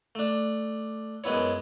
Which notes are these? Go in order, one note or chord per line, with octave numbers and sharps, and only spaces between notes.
A3 D4
F#2 G#3 B3 E4 C#5